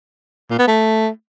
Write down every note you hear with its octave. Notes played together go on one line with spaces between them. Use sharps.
A#2
B3
A3